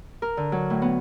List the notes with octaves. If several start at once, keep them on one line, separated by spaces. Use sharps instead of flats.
A#4
D3
F#3
A2
B3